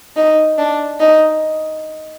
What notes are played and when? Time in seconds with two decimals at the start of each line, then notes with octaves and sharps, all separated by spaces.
0.16 D#4
0.58 D4
1.00 D#4